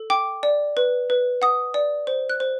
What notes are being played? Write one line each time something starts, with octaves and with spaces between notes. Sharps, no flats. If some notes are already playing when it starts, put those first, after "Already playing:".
Already playing: A4
G5 D6
D5
B4
B4
F#5 D#6
D5
C5
F#6
C5